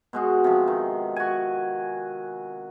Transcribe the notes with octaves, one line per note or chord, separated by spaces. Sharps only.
B2 G#3 F#4
C3 F3
D#3
F#4 G#5